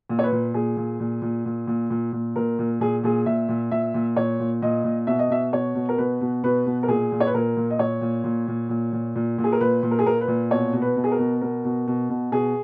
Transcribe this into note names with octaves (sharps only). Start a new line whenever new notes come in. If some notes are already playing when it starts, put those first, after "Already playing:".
A#2
C#5
B4
A#2
A#2 G#4
A#2
A#2
A#2
A#2
A#2
A#2
A#2
A#2 A#4
A#2
A#2 G#4
A#2 G#4
A#2 E5
A#2
A#2 E5
A#2
A#2 C#5
A#2
A#2 D#5
A#2
B2 E5
D#5
B2 E5
B2 C#5
B2
A#4
B2 B4
B2
B2 B4
B2
A#4
A#2 G#4
A#2
C#5
B4
A#2 A#4
A#2
D#5
A#2 C#5
A#2
A#2
A#2
A#2
A#2
A#2
A#2
G#4
A#4
A#2 B4
A#2
A#4
G#4
A#2 A#4
B4
A#2
B2 C#5
B2
B4
B2
G#4
A#4
B2
B2 A#4
B2
B2
B2
B2 G#4